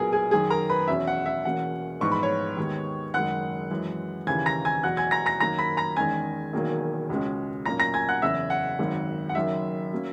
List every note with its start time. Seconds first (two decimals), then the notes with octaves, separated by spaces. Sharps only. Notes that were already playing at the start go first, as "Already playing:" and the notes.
Already playing: B1 A#2 F#3 B3 G#4 A#4 G#5
0.13 G#4 G#5
0.31 F#2 D#3 F#3 G#4 G#5
0.50 A#4 A#5
0.70 B4 B5
0.88 E2 B2 F#3 C#4 E5
1.07 F#5
1.26 E5
1.45 E1 E2 B2 A#3 C#4 F#5
2.01 A#1 G#2 E3 B3 C#6
2.12 B5
2.23 C#5 C#6
2.57 D#2 D#3 G#3 B3
3.14 F#1 F#2 D#3 G#3 F#5 F#6
3.71 F#2 E3 G#3
4.27 D#2 C#3 E3 G#5 G#6
4.46 A#5 A#6
4.65 G#5 G#6
4.83 E2 B2 F#3 F#5 F#6
4.97 G#5 G#6
5.11 A#5 A#6
5.26 A#5 A#6
5.40 F#2 D#3 A#3 A#5 A#6
5.58 B5 B6
5.77 A#5 A#6
5.96 E2 D#3 G#3 C#4 G#5 G#6
6.53 E1 E2 D#3 F#3 A#3
7.10 C#2 B2 G#3 C#4
7.66 B1 A#2 A#3 C#4 A#5 A#6
7.79 A#5 A#6
7.94 G#5 G#6
8.09 F#5 F#6
8.22 F#1 E2 C#3 E5 E6
8.50 F#5
8.79 G#1 F#2 D#3 G#3
9.29 F#5
9.35 F#1 F#2 D#3 E5
9.93 F#3 A#3 C#4